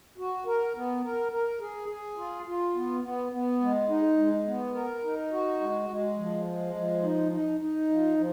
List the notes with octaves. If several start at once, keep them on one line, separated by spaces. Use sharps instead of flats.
F#4
A#4
B3
A#4
A#4
G#4
G#4
F4
F4
B3
B3
B3
G#3
D#4
G#3
B3
A#4
D#4
F#4
G#3
G#3
F3
G#3
F3
D#4
D#4
D#4
F3
F3